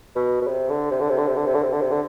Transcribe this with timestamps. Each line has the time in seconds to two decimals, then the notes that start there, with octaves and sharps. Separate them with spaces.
0.16 B2
0.42 B2
0.47 C3
0.69 D3
0.91 C3
1.00 D3
1.09 C3
1.18 D3
1.27 C3
1.37 D3
1.46 C3
1.54 D3
1.63 C3
1.73 D3
1.81 C3
1.91 D3